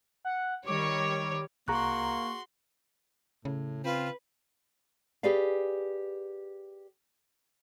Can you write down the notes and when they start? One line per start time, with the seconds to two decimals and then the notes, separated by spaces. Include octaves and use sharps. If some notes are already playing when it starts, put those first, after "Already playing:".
0.25 F#5
0.67 D#3 G3 C#5 D6
1.68 C2 A#3 F#4 G#4 A#5 C6 C#6 F#6
3.45 A2 C#3
3.84 C4 F4 B4
5.23 G4 G#4 B4 D5 F5